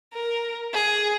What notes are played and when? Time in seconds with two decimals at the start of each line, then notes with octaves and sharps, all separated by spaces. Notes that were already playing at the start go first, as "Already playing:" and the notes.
0.13 A#4
0.73 G#4